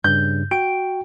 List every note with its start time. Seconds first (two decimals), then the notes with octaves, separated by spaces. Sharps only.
0.04 G2 C#3 G6
0.51 F#4 G5 D7